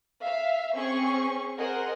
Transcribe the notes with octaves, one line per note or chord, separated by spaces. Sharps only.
E5 F5
C4 C#4 G#4 C#6
G#4 A#4 C5 D#5 F#5